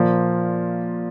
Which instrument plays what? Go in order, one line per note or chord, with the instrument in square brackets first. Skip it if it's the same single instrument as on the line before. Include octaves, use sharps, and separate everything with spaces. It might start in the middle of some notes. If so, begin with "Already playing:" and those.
Already playing: [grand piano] A#2 F3 A#3